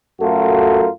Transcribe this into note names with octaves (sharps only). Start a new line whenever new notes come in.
F#2 A3 F4 F#4 A4 A#4